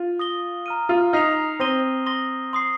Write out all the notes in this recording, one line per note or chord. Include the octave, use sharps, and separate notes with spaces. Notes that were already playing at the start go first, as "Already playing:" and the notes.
Already playing: F4
D#6 A#6 G7
A#5 F6 D#7
F4
D#4 F6 C7 F7
C4 C6 D#6 A#6 D#7 G7
C6 D#6 A#6 G7
C6 D#6 C7